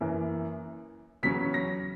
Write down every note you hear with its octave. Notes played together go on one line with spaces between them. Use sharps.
F#2 E3 A#3
E2 C#3 F#3 C#4 B6
A#6